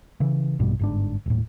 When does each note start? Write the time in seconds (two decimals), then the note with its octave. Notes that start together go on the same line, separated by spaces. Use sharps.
0.20 C#3 E3
0.59 A#1 G2 B2 G3
0.79 G1 G#2 D4
1.26 D#1 A2